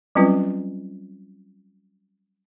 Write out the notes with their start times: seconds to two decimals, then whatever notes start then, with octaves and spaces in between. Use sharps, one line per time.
0.15 F#3 G3 C4 C#4 F4 B4